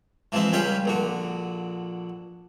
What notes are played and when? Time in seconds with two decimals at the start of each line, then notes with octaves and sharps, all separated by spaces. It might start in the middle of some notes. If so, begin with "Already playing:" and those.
0.32 E3 F3 G#3 C4 E4
0.52 C#2 G3 C#4 F4 G5 B5
0.85 A#1 D3 F#4